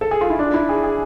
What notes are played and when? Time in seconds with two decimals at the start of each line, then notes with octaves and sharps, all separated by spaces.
0.01 A4
0.11 G#4
0.21 F4
0.30 E4
0.39 D4
0.54 E4
0.69 G#4
0.84 G#4